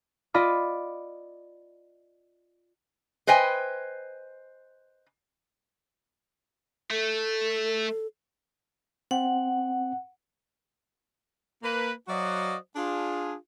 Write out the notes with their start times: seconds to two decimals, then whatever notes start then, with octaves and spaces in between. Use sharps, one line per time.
0.34 F4 D5 D#5 B5 D6
3.27 B4 C5 D#5 G5 G#5
6.91 A3 A4
9.11 C4 F#5
11.63 A#3 B4
12.08 F#3 F#4 C5 D5 D#5 F5
12.76 D4 F4 G#4